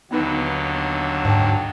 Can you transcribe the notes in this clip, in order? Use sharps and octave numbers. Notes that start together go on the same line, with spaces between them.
D#2 D3 F#3 B3 D#4 B4
G#2 G5 A5